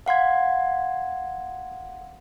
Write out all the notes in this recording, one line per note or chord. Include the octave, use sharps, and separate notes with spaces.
F5 F#5 C6 G#6